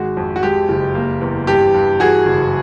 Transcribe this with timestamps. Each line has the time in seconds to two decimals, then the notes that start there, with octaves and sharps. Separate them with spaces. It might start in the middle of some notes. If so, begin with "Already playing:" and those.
Already playing: G#1 G#3 F#4
0.17 F2
0.36 F#4
0.43 G#3 G4
0.69 F#1
0.95 A#3
1.21 E2
1.47 G2 G4
1.74 G2
2.00 E3 F#4 G#4
2.26 F#1